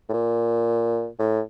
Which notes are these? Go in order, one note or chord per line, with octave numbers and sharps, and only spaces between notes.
A2
A#2
A2